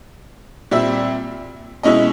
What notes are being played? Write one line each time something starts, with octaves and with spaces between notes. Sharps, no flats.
A#2 G3 C4 E5
B2 G#3 C#4 E4 D#5